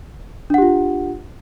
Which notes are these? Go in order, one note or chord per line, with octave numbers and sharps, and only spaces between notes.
D4 F4 G4 F#5